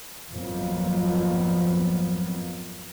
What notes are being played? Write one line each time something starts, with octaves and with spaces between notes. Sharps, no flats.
G#1 F2 F3 F#3 A#3 B3